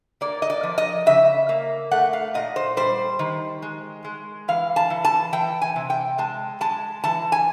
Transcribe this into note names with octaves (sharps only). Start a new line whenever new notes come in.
A#3 D5
D#5
D5
F3
D#5
C#3 E5
A#3
A3 F#5
F5
A#2 D#5
C5
G3 C5
D#3
G#3
G#3
E3 F5
A5
E3
A5
E3 G5
G#5
C3
G5
G#3 A5
G#3 A5
E3 A5
G#5